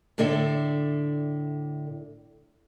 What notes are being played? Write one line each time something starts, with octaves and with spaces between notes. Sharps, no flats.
A2 D3 D4 A4 D5 E5